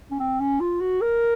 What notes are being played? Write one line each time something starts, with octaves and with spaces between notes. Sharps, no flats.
C#4
C4
C#4
F4
F#4
A#4